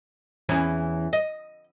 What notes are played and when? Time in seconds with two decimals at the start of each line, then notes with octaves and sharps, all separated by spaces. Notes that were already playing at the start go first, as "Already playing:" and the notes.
0.49 E2 E3 C#4
1.13 D#5